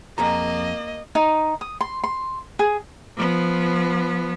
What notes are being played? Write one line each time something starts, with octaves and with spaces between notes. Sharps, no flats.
F2 A#3 G#4 D#5 A#5
D#4
D#6
C6
C6
G#4
F3 B3